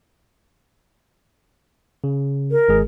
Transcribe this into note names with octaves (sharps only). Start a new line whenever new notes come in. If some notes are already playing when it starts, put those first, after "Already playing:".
C#3
A#4
G#1 G#3 G#4